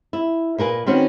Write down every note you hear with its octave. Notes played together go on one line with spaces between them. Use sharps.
E4
A#2 A#4 B4 G#5
D#3 C4 C#4 F#4 B4